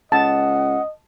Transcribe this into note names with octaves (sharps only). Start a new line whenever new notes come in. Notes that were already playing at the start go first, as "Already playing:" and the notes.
C#2 D#5 F#5 A5